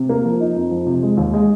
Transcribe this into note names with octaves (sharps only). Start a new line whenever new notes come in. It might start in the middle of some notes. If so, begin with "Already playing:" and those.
Already playing: C3
A#3
F3
D#4
F2
F3
C3
G#3
D#2
G#3